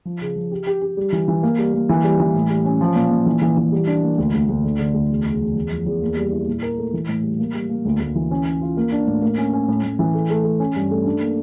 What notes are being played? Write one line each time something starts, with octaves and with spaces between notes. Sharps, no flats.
F3
C#3
F3
G4
G4
G4
G3
E3
E3
A#3
G3
A#3
E3
G3
E3
A2
G3
C#4
F3
A#2
A#2
E3
E3
E3
G3
D4
A#3
D2
D2
D2
D3
D3
D2
E2
C#3
E2
E2
F3
E2
A#3
G3
E4
A#2
A#4
A3
E3
A2
G3
A#3
G3
A#3
D2
D2
E3
C#4
C#4
F4
A#3
D4
A2
A#3
C#4
C#4
A2
A2
E3
A3
A3
A3
C#4
G2
A3
D4
A#3